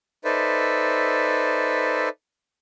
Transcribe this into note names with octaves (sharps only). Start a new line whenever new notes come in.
D#4 A4 B4 C5 D5 E5